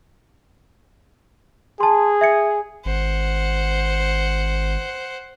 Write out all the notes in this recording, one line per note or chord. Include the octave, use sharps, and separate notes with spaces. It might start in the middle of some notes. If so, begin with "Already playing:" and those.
G#4 A5 C6
E5 G#6 C#7
G#1 C5 F#5